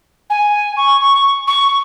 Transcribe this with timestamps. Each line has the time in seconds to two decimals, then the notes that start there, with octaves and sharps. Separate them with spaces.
0.30 G#5
0.77 C#6
1.01 C#6
1.47 C#6